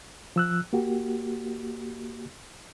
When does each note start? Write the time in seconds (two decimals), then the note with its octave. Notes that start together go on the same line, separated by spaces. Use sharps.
0.36 F3 E6 F#6
0.73 A#3 F#4 G4